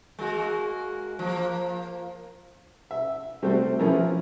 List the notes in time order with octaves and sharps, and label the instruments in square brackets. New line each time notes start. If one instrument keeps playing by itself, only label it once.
[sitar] G#3 A#3 F#4
F3 A#3
[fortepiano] E5
C3 G3 A3 C4 F#4 C5
F3 B3 C#4 E4 G#4 A#4